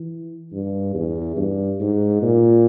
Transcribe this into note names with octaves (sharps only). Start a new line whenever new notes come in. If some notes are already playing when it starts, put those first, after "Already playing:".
Already playing: E3
G2
E2
G2
G#2
A#2